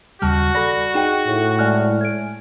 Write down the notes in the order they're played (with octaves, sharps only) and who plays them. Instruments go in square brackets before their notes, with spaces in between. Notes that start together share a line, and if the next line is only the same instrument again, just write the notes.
[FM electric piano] D#2 C#3 G3 [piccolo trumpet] F#4 [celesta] A5 F6
[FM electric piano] A4 D5 [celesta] B5 A#6
[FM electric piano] D#4 G#4 [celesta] G5 E7
[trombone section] A2
[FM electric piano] G#3 G#5 F6 [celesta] D5 F#6
[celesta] G#6 D7